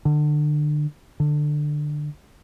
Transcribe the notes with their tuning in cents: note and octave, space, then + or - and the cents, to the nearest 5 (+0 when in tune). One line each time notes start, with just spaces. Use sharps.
D3 +30
D3 +20